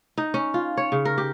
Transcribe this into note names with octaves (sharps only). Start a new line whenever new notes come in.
D#4
C#4
F4
C#5
C#3
A#4
G4